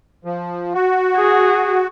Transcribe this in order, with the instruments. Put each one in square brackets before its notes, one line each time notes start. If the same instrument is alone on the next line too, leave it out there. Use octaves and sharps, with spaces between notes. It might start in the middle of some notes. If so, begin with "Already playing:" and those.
[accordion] F3
F#4
[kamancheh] G#4